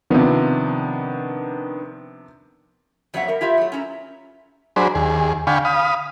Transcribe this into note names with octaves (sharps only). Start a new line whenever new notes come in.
C3 D#3 F3 B3 D4
F2 F#3 A#3 C#5 E5 F#5
G3 A#4
E4 F4 G4 E5
F#3 A3
C#4 E4 A#5
F#3 D4 G#4 C5 B5
D#2 G#4
D3 F5 G5 G#5 B5 C#6
F5 B5 D#6